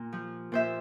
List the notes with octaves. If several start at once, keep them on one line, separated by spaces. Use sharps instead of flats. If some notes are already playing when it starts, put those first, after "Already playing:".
Already playing: A#2
F3
A#2 C5 E5